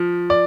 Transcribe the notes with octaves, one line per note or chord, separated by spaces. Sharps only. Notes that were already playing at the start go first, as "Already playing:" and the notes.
Already playing: F3
D5